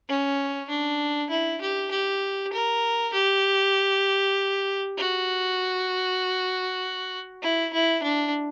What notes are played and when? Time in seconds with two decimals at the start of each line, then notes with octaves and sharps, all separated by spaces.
0.09 C#4
0.69 D4
1.30 E4
1.61 G4
1.91 G4
2.53 A#4
3.13 G4
4.98 F#4
7.42 E4
7.73 E4
8.03 D4